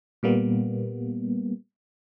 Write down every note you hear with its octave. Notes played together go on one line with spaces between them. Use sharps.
A#2 G3 A#3 B3